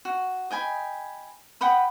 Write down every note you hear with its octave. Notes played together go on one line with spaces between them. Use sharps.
F#4
D#5 G5 G#5 B5
F#5 G5 B5 D#6